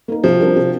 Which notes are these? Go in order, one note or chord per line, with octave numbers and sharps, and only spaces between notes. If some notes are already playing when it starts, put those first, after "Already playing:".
A#3 D#4 A#4
C3 F3
G3 D4 F4 A#4
C3